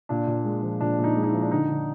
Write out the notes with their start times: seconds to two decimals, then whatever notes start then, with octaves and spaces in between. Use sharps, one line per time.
0.09 A#2 D4
0.27 A#2
0.45 G#3
0.62 F3
0.81 A#2 D4
0.98 A#2
1.04 D#4
1.17 G#3
1.23 D#4
1.28 E4
1.34 F3
1.42 D4
1.51 D3 D#4
1.69 D3